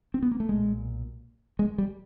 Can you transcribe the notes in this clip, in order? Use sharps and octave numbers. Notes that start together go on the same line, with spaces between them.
C4
B3
A#3
A3
B1 A#2 G#3
G#3
G3